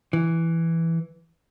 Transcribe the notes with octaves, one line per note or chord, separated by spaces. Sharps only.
E3